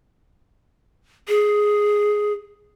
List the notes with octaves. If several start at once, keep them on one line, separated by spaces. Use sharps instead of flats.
G#4